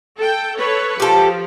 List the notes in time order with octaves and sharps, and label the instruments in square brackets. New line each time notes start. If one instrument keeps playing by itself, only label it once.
[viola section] A4 G5
A4 B4 C#5
[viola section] F3 [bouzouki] G4 A4